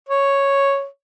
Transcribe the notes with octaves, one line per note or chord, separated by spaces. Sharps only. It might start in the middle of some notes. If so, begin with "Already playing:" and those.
C#5